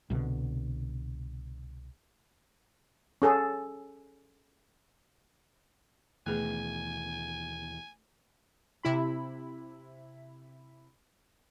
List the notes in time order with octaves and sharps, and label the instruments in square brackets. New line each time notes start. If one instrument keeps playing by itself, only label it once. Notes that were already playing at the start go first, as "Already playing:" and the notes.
[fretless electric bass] C2 B2 D3
[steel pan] C#4 G#4 A4
[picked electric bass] D#2 B2 E3 [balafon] A3 G#4 B4 [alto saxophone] G#5
[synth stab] C3 E4 B5